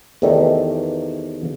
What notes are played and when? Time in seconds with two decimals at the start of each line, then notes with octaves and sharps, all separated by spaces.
0.22 E2 C3 D#3 A3 D#4